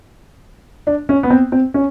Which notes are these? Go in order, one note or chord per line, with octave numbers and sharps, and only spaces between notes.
D4
C#4
B3
C4
C4
C#4